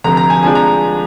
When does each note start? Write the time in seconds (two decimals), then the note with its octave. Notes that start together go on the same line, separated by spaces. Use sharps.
0.04 F1 F2 D3 A#5
0.17 A#5
0.30 G#5
0.43 F2 F3 G#3 D4 G#5
0.55 A#5